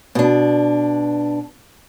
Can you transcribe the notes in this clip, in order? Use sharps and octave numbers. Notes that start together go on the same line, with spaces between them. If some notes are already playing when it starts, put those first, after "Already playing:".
B2 D4